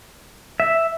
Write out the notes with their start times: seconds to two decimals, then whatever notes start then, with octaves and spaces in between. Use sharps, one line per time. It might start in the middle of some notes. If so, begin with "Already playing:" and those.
0.60 E5